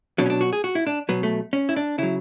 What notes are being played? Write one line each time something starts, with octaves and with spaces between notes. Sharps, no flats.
B2 F#3 D4
C#4
D4
F#4
G#4
F#4
E4
D4
B2 F#3 B3
A3
C#4
E4
D4
C#3 F#3 E4